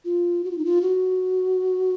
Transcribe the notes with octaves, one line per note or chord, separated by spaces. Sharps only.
F4
F#4
F4
D#4
F4
F#4